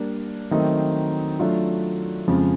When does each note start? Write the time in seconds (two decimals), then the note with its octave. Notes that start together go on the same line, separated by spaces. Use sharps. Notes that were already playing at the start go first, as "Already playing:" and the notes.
Already playing: G3 A#3 D4
0.51 D#3 F#3 A3 C4 D#4
1.39 F#3 A3 D4 F4
2.28 F2 C#3 F3 G#3